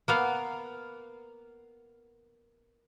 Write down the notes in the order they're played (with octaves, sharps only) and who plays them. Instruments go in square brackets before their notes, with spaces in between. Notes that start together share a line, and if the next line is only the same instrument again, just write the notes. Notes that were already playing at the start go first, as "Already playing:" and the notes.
[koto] A#3 B3 F5